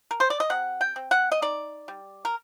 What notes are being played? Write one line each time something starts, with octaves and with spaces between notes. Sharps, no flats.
A#4
C5
D5
D#5
C3 F#5
G5
C4
F#5
D#5
D#4 D5
G3
A#4